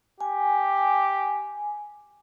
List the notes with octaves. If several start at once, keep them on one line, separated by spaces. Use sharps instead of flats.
G4 G#5